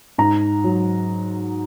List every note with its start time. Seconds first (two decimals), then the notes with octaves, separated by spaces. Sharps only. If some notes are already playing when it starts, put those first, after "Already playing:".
0.18 G#2 A#5
0.64 F#3